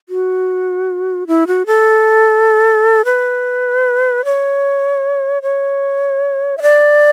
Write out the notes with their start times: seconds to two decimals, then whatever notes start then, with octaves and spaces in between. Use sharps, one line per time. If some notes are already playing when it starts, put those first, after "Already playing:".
0.09 F#4
1.27 E4
1.47 F#4
1.66 A4
3.05 B4
4.25 C#5
5.42 C#5
6.58 E5
6.62 D5